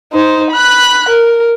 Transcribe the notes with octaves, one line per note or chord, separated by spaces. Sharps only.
D#4 C5
B5 F#6
A#4